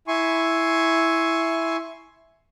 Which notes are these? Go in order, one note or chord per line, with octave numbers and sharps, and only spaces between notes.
E4 G#5 C6 C#6